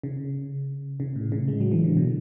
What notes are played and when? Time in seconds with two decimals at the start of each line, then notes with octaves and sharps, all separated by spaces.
0.03 C#3
1.00 C#3
1.16 A2
1.32 C#3
1.48 G#3
1.61 F#3
1.72 E3
1.84 D3
1.97 B2